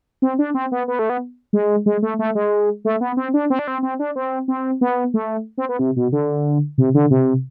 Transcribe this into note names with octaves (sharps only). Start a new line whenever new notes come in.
C4
D4
C4
B3
B3
A3
B3
G#3
G#3
A3
A3
G#3
A3
B3
C4
D4
C4
D4
C4
C4
D4
C4
C4
B3
A3
C4
B3
C3
B2
D3
C3
D3
C3